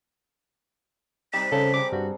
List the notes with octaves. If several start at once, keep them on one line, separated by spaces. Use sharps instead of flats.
C3 G3 D#4 G4 A5 B6
C#3 G4 A4 C5 D5
G#4 A4 A#5 D6
G2 F#4